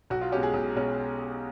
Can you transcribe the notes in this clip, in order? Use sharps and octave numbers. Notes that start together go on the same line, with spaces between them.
B1 F#4
F4
B2 G#3 C#4 G4
G#4
B1
B2 G#3 C#4